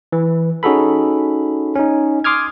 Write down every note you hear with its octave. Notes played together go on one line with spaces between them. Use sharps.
E3
C#4 D#4 F#4 G#4 A4 B5
C#4 D#4
C6 D6 D#6 F6 G#6